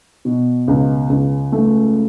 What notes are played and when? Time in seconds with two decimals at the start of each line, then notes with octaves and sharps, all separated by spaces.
0.25 B2
0.68 C#2
1.09 C#2
1.52 A3